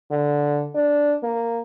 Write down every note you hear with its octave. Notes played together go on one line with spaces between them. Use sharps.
D3
D4
A#3